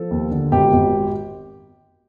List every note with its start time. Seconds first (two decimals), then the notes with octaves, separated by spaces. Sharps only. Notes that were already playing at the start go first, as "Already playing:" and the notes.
Already playing: F3 A4
0.11 D#2
0.31 D3
0.52 G#1 G4
0.73 G#1